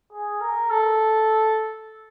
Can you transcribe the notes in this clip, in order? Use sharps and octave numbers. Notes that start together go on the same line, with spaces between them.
G#4
A#4
A4